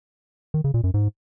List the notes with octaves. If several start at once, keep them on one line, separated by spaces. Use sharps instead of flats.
D#3
C#3
A#2
F#2
G#2